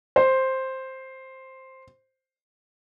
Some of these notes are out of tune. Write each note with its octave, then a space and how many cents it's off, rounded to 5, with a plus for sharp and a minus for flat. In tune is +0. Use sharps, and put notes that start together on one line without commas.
C5 +5